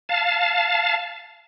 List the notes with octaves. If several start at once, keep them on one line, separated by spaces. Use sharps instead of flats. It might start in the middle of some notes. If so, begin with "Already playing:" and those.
F5 A5